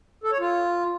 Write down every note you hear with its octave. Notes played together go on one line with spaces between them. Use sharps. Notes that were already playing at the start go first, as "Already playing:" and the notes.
A4
C#5
F4